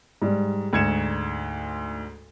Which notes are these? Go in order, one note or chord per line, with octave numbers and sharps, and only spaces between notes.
G#2 G3
D2 G#2 G#6 C#7 E7